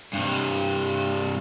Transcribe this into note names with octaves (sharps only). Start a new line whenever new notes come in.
G2 C3